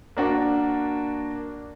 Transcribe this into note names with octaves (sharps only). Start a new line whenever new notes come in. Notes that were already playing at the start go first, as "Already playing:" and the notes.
A#3 D4 F#4